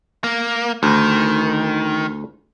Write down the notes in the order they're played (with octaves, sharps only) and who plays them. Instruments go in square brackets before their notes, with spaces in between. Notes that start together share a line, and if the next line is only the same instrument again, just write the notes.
[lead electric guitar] A#3
[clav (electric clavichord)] D2 [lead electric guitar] D#3